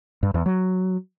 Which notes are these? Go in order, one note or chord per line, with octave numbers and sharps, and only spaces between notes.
G2
E2
F#3